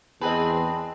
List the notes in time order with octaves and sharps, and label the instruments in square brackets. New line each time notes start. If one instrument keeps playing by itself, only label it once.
[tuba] E2 [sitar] C4 G#4 B4 [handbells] D#5 G5 A5